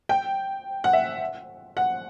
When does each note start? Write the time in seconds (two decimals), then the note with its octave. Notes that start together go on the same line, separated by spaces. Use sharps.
0.09 G5
0.84 F#5
0.93 E5
1.77 F#5